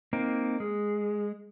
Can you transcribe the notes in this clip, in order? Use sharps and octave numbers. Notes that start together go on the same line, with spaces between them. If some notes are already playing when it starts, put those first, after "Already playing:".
A#3 C4 D#4
G#3 G#4